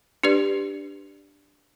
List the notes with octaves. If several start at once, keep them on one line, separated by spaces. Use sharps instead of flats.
D4 G4 B4 D5